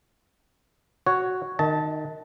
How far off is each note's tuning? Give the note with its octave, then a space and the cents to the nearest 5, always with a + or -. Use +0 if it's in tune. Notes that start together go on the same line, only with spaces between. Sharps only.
F#4 +0 C#5 +0
D#3 -20 D#5 +40 A5 +0